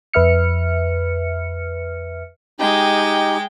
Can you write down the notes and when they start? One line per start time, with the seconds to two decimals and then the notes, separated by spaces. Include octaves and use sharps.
0.14 F2 B4 E5 F6 C#7
2.59 G#3 D#4 G4 G5